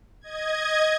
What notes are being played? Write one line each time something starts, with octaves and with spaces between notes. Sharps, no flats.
D#5 G#6